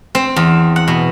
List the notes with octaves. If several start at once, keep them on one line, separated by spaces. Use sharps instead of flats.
C4
E2
F#5
B2